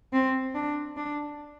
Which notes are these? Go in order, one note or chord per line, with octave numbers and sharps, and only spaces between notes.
C4
D4
D4